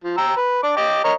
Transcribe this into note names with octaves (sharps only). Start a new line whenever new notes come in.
F3
G5 A#5 E6
B4
D4 D6
D#5 G5 D6
A#4 C#5 D#5